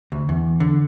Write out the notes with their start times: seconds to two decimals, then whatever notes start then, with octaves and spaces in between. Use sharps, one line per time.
0.12 D2
0.29 E2
0.60 D3